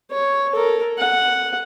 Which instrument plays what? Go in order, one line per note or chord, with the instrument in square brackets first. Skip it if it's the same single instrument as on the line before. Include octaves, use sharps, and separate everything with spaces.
[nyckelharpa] C#5
A4 A#4
F#5